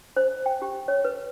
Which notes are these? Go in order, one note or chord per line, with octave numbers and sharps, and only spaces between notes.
C5
G5
G4
C#5
B4